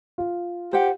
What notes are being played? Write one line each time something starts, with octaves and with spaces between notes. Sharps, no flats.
F4
G4 C5 F#5